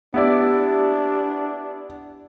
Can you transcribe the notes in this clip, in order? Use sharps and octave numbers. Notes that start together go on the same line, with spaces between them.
B3 D4 E4 G4 D5